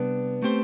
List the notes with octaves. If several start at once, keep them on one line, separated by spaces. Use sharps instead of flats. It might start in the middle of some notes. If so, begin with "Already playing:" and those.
Already playing: C3 G3 B3 D4
A3 C4 G4 C5